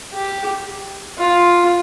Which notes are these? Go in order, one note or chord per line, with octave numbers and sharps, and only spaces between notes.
G4
F4